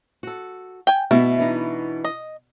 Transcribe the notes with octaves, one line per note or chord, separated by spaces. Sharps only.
F#4 A4
G5 G#5
B2 A3 E4
E3 D4 D#4
D#5